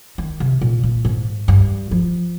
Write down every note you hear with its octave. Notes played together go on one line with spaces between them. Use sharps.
D#3
C3
A#2
A#2
G#2
G2
F3